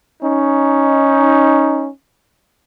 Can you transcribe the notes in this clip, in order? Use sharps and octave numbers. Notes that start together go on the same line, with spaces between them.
C#4 D#4